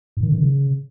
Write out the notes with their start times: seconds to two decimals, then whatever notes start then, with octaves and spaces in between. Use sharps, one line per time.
0.17 G#2
0.23 D#3
0.29 D3
0.34 D#3
0.40 C#3